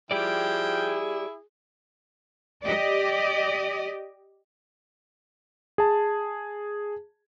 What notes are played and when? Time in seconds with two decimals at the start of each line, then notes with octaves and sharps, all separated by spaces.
0.11 F3 E4 G4 G#4 D5 G5
2.62 G4 D5 D#5
5.78 G#4 A5